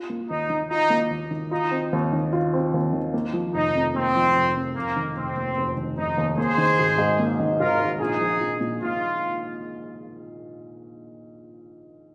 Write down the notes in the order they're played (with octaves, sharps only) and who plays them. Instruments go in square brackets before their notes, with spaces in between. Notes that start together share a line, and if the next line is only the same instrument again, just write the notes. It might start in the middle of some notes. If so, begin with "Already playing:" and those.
Already playing: [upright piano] F4
A#3
[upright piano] D#2 [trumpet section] D#4
[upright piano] D#3
[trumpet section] D#4 [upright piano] F4
[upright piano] A#3
D#2
D#3
[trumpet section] D#4 [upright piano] F4
[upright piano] C4
D#2
D#3
F4
C4
D#2
D#3
A#3
F3
[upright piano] F1 [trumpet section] D#4
[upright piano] F2
[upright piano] A#3 [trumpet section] C4
[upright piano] F3
F1
F2
[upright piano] F1 [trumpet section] A#3
[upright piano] D#3
[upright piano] F1 [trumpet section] C4
[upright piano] D#2
F1
D#3
[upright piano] F1 [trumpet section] D#4
[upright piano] D#2
[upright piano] A#3 [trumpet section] G#4 C5
[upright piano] D#3
G#1
G#2
A#3
D#3
[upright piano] G#1 [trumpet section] F4 A#4
[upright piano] G#2
[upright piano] A#1 [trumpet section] D#4 G#4
[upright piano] F3
A#1
A#2
[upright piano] A#1 [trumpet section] F4